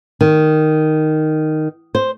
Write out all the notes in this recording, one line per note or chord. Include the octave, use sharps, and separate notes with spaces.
D#3
C5